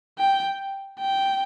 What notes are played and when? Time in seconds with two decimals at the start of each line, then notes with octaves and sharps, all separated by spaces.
0.18 G5
1.00 G5